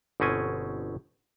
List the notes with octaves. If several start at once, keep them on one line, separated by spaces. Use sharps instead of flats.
G1 B2 C4 C#4 G#5